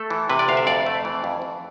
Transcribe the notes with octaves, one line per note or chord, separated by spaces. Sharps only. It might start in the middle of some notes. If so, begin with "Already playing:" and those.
Already playing: A3 A4
E3
C3 B4
D5
D2 F5
E5
F2 D5
A3
E3
F2
F2